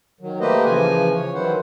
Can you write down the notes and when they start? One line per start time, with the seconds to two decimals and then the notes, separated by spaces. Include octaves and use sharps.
0.21 D#3 F#3
0.40 A3 A#3 G4 B4 C5 D#5
0.65 C#3 E3 F3 G#5
1.14 C#5
1.34 D#3 E3 F#3 E4 C5 F#5